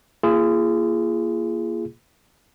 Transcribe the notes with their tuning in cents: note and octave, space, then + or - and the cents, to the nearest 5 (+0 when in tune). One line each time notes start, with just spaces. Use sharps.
A#3 +0 F4 -35 G#4 +0